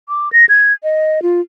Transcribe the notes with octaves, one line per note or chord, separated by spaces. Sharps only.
D6
A#6
G#6
D#5
F4